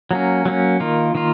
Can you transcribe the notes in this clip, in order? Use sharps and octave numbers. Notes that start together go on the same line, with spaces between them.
F#3 A#3 C#4
F#3 A#3 C#4
D#3 A#3 F4
D#3 A#3 F4